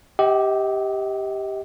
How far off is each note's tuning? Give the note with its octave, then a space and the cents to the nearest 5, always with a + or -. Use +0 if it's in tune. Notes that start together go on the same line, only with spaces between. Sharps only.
G4 +0 D#5 +40 F#5 +45